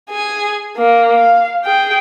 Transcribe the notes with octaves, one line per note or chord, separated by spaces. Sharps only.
G#4 G#5
A#3
F5
G#4 G5